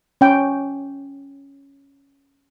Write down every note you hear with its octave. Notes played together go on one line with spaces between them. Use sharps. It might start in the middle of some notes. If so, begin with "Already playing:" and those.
C#4 G5